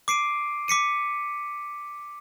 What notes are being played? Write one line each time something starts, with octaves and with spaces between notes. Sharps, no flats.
D6 C7 D7 D#7
D6 B6 C#7 D#7